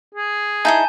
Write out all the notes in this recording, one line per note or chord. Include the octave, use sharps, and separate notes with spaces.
G#4
D#4 E4 G#5 A5 D#6 G6